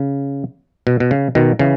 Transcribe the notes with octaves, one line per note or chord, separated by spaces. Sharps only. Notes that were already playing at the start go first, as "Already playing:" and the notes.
Already playing: C#3
B2
B2
C#3
B2 D#3
C#3 E3